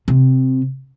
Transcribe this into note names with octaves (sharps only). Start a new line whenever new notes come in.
C3